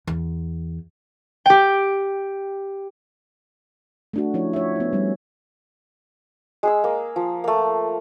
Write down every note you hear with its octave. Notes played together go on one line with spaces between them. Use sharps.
E2
G4 G5
A3 D4 F#4
F3 C#4 E4 C#5
C#5 E5
B3 D#4
G3 C#4
G#3 G#4 E6
A#3
F3
A3 A#3